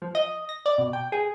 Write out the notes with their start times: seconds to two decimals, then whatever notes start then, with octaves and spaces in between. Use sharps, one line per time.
0.02 F3
0.15 D#5
0.49 A#6
0.66 D5
0.78 B2
0.93 G5
1.12 G#4